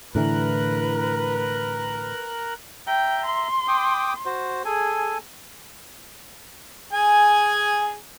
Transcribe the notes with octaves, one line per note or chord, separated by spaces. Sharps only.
A2 D3 E3 A#4 B4 F#6
E5 G5 A#5
C6
G5 D6 D#6
F#4 C5
G#4 A4 G#5
G#4 G#5